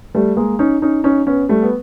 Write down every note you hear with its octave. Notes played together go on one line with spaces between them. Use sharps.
G3 A3
G#3 A#3
C#4 D#4
C#4 D#4
C#4 D#4
B3 C#4
G3 A3
B3